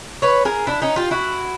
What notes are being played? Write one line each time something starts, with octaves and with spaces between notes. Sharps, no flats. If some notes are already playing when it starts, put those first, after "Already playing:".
B4 C#5
G#4 A#4
D4 E4
C#4 D#4
F4 G4
E4 F#4